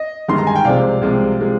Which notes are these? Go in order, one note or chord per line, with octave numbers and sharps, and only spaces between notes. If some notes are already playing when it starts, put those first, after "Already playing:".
Already playing: D#5
G1 G2 D#3 G#3 C6
A#5
G#5
G5
C2 C3 F3 G#3 D5 F5
C2 C3 F3 G#3
C3 F3 G#3